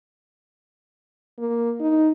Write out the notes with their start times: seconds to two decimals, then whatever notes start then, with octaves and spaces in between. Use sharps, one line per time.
1.39 A#3
1.80 D#4